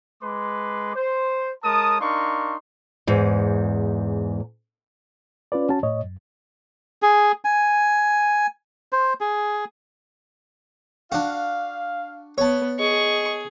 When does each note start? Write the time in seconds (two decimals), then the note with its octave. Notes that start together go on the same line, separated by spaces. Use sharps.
0.22 G#3 B4 C6 D6
0.95 C5
1.64 G#3 A#4 C#5 A5 D#6
2.01 D4 D#4 A#4 F5 C6 C#6
3.07 E2 G#2
5.52 C#4 F4 B4 D5
5.69 C#4 F#4 A5
5.83 A2 C#5 D#5
6.03 F#2
7.02 G#4
7.45 G#5
8.92 C5
9.21 G#4
11.12 D4 F#4 F5
12.38 B3 C#5 A5
12.80 G#4 D#5 C#6